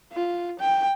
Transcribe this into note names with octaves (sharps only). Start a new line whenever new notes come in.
F4
G5